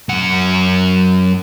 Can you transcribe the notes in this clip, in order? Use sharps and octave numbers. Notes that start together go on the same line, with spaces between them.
F#2 F#5